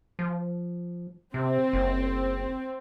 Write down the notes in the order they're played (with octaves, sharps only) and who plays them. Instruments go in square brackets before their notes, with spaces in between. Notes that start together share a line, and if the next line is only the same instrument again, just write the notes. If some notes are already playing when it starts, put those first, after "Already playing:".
[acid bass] F3
[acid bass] C3 [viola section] C4
[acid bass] F#1